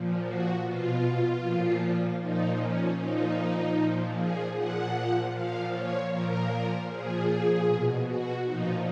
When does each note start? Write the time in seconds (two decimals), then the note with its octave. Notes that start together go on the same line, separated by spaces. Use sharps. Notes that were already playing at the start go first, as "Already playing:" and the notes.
Already playing: A#2 F3
0.24 F#4
0.62 B2 F4
1.40 A#2 F3
2.19 A#2 F3 D#4
2.58 C#4
2.97 A#2 F3 D#4
3.75 A#2 F3
4.14 G#4
4.53 A#2 F3 F#5
5.32 A#2 F3 F5
5.71 C#5
6.09 A#2 F3 A#4
6.88 A#2 F3 G#4
7.66 B2
8.05 F#4
8.44 A#2 F3 D#4